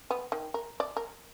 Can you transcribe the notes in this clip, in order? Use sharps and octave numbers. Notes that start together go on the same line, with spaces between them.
B3
D#3
A#4
D5
A#4